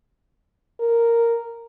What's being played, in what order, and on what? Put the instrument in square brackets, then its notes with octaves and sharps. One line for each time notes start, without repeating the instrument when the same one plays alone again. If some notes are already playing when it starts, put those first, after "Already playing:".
[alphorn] A#4